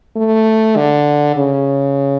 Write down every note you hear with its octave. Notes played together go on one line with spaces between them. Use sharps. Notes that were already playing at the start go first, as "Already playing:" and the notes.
A3
D3
C#3